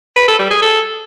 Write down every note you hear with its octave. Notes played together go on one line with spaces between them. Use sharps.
B4
A4
G3
G#4
A4